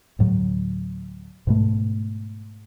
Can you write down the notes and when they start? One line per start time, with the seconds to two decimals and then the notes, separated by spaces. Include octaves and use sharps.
0.19 D2 A2 F#3
1.47 G#2 B2 A3